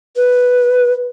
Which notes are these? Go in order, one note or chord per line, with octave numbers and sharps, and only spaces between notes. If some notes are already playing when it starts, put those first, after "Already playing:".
B4